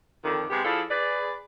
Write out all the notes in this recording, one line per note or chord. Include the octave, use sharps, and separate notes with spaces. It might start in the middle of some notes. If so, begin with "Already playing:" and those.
F2 D3 D#3
C3 G#3 B3 G4
F3 E4 G#4 A4 D5 F5
G#4 B4 D5